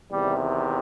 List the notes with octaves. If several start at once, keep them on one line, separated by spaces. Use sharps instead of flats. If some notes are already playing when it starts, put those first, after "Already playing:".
E2 C3 D#3 G3